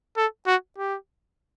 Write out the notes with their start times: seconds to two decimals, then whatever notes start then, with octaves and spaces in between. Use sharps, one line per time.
0.17 A4
0.47 F#4
0.78 G4